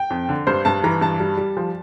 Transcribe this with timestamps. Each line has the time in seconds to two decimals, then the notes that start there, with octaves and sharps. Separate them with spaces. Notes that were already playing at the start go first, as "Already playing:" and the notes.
Already playing: G5
0.10 F2
0.29 D3
0.47 G2 C5
0.65 G2 A5
0.84 E3 A#5
1.01 G2 A5
1.20 G3
1.37 G3
1.57 F3